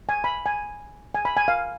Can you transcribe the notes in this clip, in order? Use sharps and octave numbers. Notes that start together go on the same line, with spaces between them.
G#5
B5
G#5
G#5
B5
G#5
F5